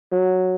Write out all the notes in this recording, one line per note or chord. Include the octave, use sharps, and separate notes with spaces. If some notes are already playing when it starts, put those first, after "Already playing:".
F#3